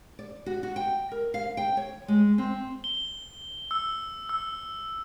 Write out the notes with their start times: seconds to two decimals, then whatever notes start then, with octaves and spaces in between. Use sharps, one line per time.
0.19 D5
0.46 F#4
0.63 F#4
0.76 G5
1.12 A#4
1.34 F5
1.57 G5
1.77 C#5
2.08 G#3
2.38 C4
2.84 G7
3.71 E6
4.29 E6